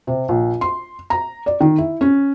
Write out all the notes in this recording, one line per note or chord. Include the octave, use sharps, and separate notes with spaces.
C3
A#1
C6
A#5
D5
D#3
E4
C#4